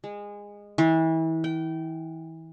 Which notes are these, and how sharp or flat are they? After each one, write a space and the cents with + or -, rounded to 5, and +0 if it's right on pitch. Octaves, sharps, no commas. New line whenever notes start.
G#3 -20
E3 -30
G5 -25